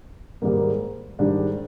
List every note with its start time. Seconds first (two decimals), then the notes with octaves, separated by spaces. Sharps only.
0.42 G#2 D#3 G3 A#3
1.19 G#2 D#3 G3 D4